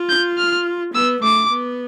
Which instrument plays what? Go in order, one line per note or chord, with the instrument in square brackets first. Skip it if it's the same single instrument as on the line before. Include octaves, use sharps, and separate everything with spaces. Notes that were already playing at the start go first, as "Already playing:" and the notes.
Already playing: [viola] F4
[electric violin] G6
F6
[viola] B3 [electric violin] E6
[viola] A3 [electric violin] D6
[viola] B3